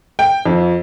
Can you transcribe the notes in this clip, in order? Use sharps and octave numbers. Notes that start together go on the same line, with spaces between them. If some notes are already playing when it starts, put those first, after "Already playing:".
G5
F2